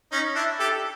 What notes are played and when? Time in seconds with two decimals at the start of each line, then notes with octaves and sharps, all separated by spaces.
0.12 C#4 D#4
0.35 D4 E4
0.59 G4 A4